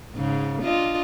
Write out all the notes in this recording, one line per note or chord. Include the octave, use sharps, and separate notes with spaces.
G#2 C#3
D4 F4 D#5